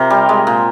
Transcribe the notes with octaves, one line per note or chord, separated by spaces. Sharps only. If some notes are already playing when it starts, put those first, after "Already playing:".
Already playing: C3 F4 G4 A#4 C5
G3
G#3
A#2